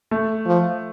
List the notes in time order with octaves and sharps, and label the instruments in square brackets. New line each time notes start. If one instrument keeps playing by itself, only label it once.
[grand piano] A3
[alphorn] F3